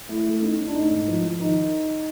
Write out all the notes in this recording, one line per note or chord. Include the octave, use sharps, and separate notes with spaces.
A3 E4
A3
C#4 D#4
C#4
D4
A3 D#4
G#2
F3
F3
D#3 D#4